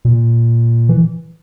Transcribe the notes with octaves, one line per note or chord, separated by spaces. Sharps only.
A#2
E3